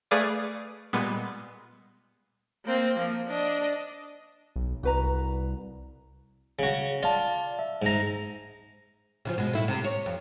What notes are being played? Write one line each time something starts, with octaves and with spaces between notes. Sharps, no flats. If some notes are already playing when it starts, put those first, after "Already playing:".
A3 G#4 B4 D5 F5
A#2 G3 G#3 B3
A#3 C4
F3 A#3
D4 D#5
B1
C2 F#4 B4 A#5
C#3 F#4
F4 D5 A5
E5
G#2 A#5
C#3 E3 F3
B2 G#3
A2 E4
C3
C#5
F2